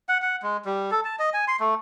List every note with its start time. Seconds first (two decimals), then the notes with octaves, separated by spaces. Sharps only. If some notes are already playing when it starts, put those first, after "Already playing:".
0.09 F#5
0.22 F#5
0.43 G#3
0.65 G3
0.91 A4
1.05 A5
1.19 D#5
1.34 G#5
1.48 C6
1.60 A3